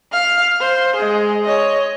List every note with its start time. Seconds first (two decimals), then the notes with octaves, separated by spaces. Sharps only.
0.12 F5 F6
0.60 C5
0.95 G#3 G#4
1.44 C#5 D#5